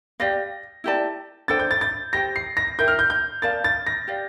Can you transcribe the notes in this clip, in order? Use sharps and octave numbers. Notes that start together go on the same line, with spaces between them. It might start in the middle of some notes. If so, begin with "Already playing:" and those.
G4 D5 F5 A#6
E4 G4 D5 A5
D4 A4 C5 G5 A6
G6
A6
A6
G4 C5 G5 A#6
C7
A#6
E4 A#4 E5 G5 G6
F6
G6
G6
A#4 D5 F5 A5 A6
A6
A#6
G4 D5 F5